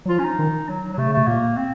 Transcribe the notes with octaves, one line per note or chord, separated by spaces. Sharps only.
F#3
F3 F4
C#4
D#4
D#3
F#3
F#3
C3 A3
C#3
C3 A3
A#2 A#3
C4